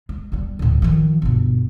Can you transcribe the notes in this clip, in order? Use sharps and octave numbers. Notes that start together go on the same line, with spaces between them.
G#3
E2 G3
D2 A2
D#3 F3
G1 B2